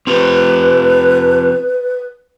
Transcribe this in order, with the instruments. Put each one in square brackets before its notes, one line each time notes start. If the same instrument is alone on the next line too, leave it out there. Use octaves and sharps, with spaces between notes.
[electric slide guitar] C4 F4 G4 [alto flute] B4